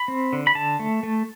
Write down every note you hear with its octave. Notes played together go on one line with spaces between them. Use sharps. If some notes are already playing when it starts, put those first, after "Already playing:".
Already playing: B5
C4
D3
B5
D3 A5
A3
A3